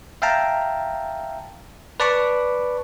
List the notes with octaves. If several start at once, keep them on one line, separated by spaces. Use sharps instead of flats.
E5 F5 G5 A5 A#5
B4 D5 A5 B5 C#6 D6